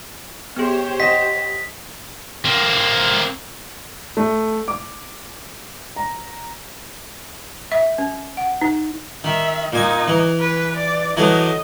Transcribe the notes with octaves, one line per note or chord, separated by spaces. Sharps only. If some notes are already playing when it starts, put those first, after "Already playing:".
B3 G4 G#4 C5 C#5
D#5 F#5 B6
A#3 C4
A3
D6
A#5
E5
C#4
F#5
D#4
D#3 E5
A#2 D#4 G#5
E3
B4
D5
E3 F#3 A3 D#5